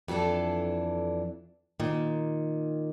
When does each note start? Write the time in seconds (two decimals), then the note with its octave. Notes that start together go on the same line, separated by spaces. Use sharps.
0.08 F2 E3 D4 A4 D5
1.80 A#2 D#3